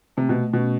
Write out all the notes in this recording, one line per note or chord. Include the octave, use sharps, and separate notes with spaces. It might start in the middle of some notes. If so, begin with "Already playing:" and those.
C3 A3
B2
A3
B2 C#4